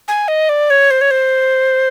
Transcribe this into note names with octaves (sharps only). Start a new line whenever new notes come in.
G#5
D#5
D5
C#5
C5
C#5
C5